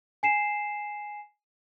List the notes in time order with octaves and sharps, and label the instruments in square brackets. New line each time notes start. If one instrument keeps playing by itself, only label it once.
[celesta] G#5 C7 E7